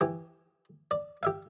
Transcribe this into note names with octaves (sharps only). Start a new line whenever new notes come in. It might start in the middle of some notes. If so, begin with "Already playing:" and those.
E3 G4
D5
G4 E5 F5